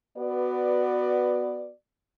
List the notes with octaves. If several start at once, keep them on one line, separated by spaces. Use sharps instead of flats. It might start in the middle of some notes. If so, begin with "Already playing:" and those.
B3 F#4 B4 D5